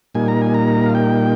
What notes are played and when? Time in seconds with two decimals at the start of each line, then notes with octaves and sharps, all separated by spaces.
0.15 A#2 G3 A#3 D#4 G#5
0.28 A#5
0.42 G#5
0.54 A#5
0.86 F5
0.95 G5